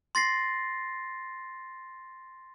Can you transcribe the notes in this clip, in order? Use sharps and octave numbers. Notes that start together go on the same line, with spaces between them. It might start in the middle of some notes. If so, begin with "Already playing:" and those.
C6 A6 A#6 C7